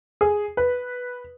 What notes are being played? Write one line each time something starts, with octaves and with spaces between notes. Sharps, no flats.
G#4
B4